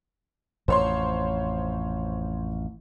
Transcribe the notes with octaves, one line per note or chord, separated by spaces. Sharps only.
A1 F2 C5 C#5 C6